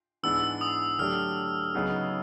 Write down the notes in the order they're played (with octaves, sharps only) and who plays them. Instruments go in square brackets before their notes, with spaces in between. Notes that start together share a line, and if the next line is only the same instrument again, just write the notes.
[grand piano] G#2 E3 G#3 B3 D4 [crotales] E6
[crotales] D#6
[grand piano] D3 F#3 A3 D4 G4 [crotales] F6
[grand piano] C#3 F#3 B3 D#4 G#4